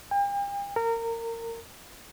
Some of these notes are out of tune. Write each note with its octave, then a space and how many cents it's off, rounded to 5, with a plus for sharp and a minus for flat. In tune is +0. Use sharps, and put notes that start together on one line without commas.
G5 +40
A#4 -25